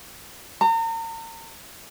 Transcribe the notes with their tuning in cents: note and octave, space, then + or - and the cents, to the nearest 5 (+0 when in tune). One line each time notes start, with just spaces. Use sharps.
A#5 -40